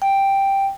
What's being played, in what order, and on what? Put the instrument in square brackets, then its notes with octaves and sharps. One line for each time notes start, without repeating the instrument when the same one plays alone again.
[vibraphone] G5